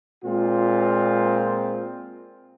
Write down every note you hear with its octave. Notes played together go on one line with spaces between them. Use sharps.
A#2 G#3 C4 F4